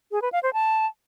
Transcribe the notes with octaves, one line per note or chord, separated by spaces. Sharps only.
G#4
B4
F5
C5
A5